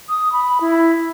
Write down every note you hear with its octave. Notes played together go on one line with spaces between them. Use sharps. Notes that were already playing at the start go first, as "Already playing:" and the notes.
D#6
B5
E4